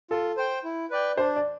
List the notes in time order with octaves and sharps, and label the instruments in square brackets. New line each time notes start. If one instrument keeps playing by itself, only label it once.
[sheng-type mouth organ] F4 [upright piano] A4
[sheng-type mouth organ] C5 G5
E4
B4 D5 G5
[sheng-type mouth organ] D4 [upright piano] C5
[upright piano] D5